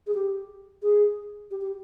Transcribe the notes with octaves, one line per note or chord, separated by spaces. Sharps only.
G#4
G4
G#4
G4
G4